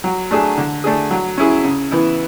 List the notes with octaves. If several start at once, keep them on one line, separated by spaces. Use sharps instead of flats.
F#3
A3 D4 G#4
D3
A3 D4 G#4
F#3
C#4 E4 G#4
C#3
E3 B3 E4